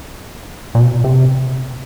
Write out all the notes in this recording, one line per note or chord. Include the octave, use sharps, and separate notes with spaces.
A#2
B2
C3